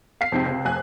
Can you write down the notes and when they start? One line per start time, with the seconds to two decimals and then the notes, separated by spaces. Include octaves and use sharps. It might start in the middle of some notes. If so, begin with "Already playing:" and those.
0.21 F5 B6 C7
0.32 F2 G#2 C3
0.46 C#2 C3
0.64 F1 F2 F5 G#5 F#6